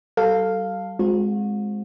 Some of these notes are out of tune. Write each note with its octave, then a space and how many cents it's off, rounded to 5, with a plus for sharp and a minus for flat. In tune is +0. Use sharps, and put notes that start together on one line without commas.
G3 -35 A4 +15 F5 +0
G#3 +0 C4 +0 F#4 -45